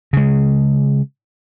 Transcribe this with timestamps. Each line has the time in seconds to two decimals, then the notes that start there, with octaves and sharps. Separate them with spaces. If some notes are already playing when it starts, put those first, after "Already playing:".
0.13 C#3 G#3